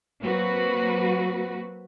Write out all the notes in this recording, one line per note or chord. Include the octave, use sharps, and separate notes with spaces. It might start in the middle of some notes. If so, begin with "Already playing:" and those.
F#3 A#3 C4 F#4 B4